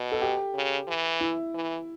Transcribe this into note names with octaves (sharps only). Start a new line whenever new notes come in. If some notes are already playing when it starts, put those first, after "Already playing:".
Already playing: B2
A4
G4
C#3
E3
E4
E3